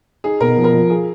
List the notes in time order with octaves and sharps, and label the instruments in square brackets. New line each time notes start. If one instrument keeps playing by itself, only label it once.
[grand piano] D#4 [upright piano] G#4
[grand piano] B2 [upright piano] A#4
[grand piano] F3
[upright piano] A#4
[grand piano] F3
[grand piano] F4 [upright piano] G#4